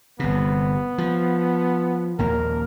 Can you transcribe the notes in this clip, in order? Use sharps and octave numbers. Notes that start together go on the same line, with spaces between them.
G1 C3 B3
F3
A#1 D#2 A#3 A#4